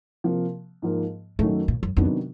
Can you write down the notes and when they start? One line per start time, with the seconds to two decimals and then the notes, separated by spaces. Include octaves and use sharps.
0.24 C3 F3 A#3
0.82 G#2 F3 A#3
1.39 F#2 A2 D#3 F#3 A3
1.68 A#2
1.83 F#2
1.97 F2 C3 D#3 F#3 B3 D4